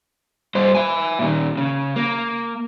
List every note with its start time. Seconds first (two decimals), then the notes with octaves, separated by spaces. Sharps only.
0.55 G2 C5
0.75 E5 G#5
1.19 A#2 D#3
1.57 C#3
1.96 A#3